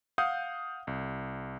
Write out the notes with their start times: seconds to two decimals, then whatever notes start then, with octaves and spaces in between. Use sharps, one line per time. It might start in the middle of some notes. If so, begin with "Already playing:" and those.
0.18 F5 F#5 D#6 G6
0.87 C2